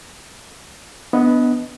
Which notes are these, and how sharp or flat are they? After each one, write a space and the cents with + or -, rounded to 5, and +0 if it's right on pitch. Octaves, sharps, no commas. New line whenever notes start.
B3 +0 D4 +0 D#5 +20